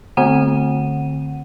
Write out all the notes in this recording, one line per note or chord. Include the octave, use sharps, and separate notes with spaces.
D3 A3 C4 F#5 D#7